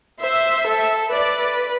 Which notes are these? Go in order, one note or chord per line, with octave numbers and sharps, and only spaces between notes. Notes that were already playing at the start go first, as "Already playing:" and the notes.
C5 E5
A4
B4 D5